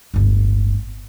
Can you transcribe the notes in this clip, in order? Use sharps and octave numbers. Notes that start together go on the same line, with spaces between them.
D1 G1